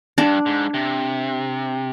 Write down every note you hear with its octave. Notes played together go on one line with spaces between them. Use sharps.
G2 D4
G#2
C3